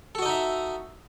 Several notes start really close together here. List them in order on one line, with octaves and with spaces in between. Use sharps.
A4 F#4 D#5 D#4 E5